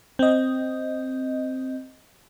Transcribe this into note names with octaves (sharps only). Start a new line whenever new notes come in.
C4 D#5